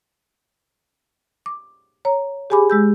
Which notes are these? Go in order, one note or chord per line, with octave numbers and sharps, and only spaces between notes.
D6
C#5 A#5
G4 G#4 G#5 B5 D6
G#3 E6 G6